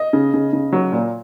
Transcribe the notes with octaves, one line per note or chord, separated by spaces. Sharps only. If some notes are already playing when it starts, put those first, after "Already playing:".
Already playing: D#5
C#3
C#3
C#3
F#3
A#2